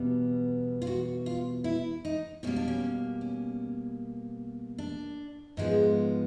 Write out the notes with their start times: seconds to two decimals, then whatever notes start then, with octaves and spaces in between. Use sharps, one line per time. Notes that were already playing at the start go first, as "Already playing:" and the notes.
Already playing: E2 B2 G3 B3
0.82 F4
0.87 F#4
1.26 F4
1.64 E4
2.05 D#4
2.43 B2 G3 A#3 C#4
2.56 D4
2.68 C#4
3.21 C#4
4.78 D4
5.57 G#2 F3 G#3 B3